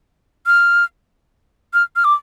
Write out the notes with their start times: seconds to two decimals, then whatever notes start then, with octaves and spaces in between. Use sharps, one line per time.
0.46 F6
1.74 F6
1.96 F6
2.04 D6